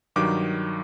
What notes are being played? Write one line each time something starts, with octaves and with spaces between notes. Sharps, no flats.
G2 D#3 F#3 D6